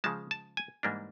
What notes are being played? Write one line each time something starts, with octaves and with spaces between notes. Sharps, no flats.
C#3 F3 G#3 A5
A5
G#5
G#2 E3 G3 A#3 D4